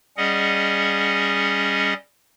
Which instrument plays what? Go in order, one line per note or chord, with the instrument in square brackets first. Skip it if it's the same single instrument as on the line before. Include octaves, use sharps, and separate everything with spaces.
[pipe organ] G3 C#4 G#4 D#5 F#5